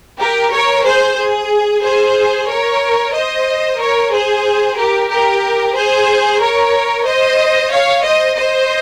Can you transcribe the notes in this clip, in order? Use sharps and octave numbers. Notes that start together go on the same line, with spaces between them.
G4 A#4
A#4 C#5
G#4 C5
G#4
G#4 C5
A#4 C#5
C5 D#5
A#4 C#5
G#4 C5
G4 A#4
G4 A#4
G#4 C5
A#4 C#5
C5 D#5
C#5 F5
C5 D#5
C5 D#5